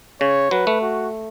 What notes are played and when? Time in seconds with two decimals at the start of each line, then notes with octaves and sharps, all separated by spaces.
0.21 C#3 C#5
0.51 F#3 B4
0.67 A3
0.81 F#4